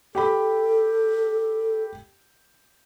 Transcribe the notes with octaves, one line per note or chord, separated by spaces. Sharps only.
G4 A4 G5 B5